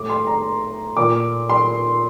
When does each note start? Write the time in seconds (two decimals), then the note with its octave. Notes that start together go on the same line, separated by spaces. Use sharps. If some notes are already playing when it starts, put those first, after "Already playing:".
Already playing: A2 D6
0.10 C6
0.27 A#5
0.97 A#2 D6
1.50 C6